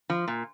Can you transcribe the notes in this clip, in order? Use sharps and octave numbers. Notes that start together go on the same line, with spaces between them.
F3
A#2